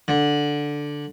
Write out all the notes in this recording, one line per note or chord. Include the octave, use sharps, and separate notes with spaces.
D3